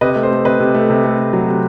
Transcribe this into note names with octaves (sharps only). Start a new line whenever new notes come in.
C3 B4 D#5
A3
C5
A3
C3 B4 D#5
C3
A3
C3
A3
A3
F#3
C3